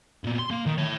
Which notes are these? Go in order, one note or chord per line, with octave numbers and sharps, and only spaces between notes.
A#2 B3
C6
A#3
D#3
E4 C#5